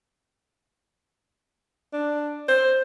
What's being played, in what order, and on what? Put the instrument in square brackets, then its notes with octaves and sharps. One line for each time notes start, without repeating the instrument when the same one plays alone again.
[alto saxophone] D4
C5